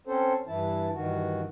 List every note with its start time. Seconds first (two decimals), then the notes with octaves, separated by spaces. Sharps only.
0.07 C4 C#4 A4 C5
0.47 G2 E3 E4 A5
0.94 G2 D#3 E3 F#4